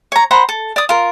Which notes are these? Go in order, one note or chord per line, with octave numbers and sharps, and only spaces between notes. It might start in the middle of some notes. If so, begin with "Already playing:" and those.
C#5 A#5
C5 F#5 A#5 B5
A4
D5 D#6
F4 A#4